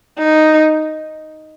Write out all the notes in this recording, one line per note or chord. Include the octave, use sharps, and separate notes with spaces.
D#4